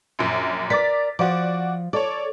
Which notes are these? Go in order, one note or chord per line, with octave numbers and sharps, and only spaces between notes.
A#1 F#2
A#4 D5 D6 A6 B6
F3 F#4 D5
A4 C#5 D5